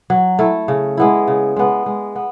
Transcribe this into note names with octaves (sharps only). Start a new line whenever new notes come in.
F#3
A3 E4
C#3
G#3 B3 E4
C#3
G#3 B3
G#3
B3